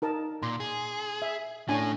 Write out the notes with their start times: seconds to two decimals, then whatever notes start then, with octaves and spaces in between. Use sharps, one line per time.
0.02 D#4 A#4 A5
0.43 A#2 C6
0.60 G#4
1.22 E5
1.68 A2 A3 C#4 D4 G#5